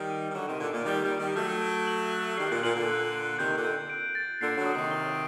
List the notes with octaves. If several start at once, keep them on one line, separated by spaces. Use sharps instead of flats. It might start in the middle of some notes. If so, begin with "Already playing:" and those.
Already playing: D#3 G3
D#7
D#3
D3 F#3 D6
C3 D#3
A#2 D3 F#6
A#2
D#3 G3 A6
D#3 G3
D7
D#3 G3
F#3 A3 G6
D7
F#7
F#6
D#3 G3 C7
A#2
A#2 F#7
A#2 D3
F#6
F#7
C3 D#3 G6
A#2 D3
G6
D7
A6
A#2 D3 C7
D3 F#3
D#6
C3 D#3
G7